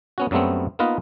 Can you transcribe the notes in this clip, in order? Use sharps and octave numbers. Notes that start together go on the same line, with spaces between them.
B3 C#4 F#4
F#2 F#3 G3 A3 B3 C4
A#3 B3 D#4 F4 B4 D#5